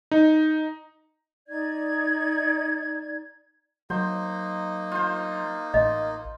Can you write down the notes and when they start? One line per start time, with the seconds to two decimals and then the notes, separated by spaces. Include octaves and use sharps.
0.11 D#4
1.48 D#4 D5 G#6
3.90 F#3 A#3 D#4 C5
4.92 F4 C5
5.74 A1 D#5